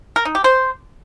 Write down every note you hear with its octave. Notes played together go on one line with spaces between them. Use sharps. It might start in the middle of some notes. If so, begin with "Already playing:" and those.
A#4
D#4
G4
C5